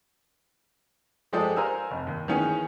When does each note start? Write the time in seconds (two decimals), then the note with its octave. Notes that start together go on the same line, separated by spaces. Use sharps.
1.33 F3 G#3 G4 A4 D5 D#6
1.57 A#4 C5 F5 G#5 A#5 E6
1.91 F1
2.07 D#2
2.28 D#3 E3 B3 C#4 G#4